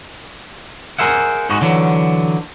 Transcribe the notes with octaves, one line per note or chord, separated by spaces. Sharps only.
G#4 A#4 C5 E5 F#5
G#2 G#3 D#4 F#4
D3 E3 F#3